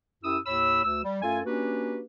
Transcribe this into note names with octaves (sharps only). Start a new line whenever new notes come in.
F#2 E4 G4 D#6 E6
D#2 A2 C#5 B5 E6
D2 E6
G3
F#2 A3 F4 A4 G#5
A#3 C#4 D4 F#4 G4 B4